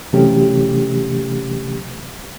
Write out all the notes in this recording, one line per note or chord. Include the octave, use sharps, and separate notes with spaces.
C3 E3 F#3 A3 C#4 G4